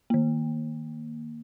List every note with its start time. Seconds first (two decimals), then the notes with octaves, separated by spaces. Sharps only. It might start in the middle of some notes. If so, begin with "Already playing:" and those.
0.10 D#3 A#3